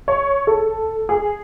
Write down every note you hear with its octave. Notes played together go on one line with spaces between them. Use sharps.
C#5
A4
G#4